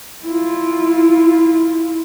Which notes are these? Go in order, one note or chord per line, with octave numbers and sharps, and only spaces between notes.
E4 F4